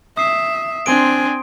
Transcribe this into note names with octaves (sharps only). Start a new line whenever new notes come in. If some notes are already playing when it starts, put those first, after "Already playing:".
E5 D#6 C7
C4 D4 G#5 C6 D7